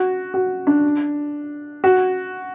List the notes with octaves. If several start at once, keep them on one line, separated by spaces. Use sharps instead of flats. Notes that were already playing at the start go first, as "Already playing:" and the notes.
Already playing: F#4
F#4
D4
F#4